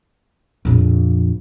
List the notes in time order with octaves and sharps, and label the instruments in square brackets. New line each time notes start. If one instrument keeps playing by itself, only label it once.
[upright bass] A#1 F2